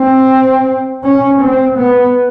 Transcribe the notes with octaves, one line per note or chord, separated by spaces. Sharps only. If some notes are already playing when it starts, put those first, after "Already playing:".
Already playing: C4
C#4
C4
B3